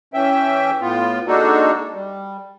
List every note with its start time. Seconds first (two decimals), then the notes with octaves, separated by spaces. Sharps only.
0.14 E3 C#4 E5 G5
0.81 A2 B3 F4
1.27 G#3 A#3 D4 D#4 F#4 A4
1.93 G3